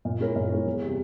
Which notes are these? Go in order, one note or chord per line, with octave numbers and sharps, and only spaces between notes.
A#2
G#3 E4 A#4 C#5
A#2
G#3 E4 A#4 C#5
E2
C3 G3